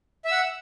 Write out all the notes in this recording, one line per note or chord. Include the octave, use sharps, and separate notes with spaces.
E5 F#5 E6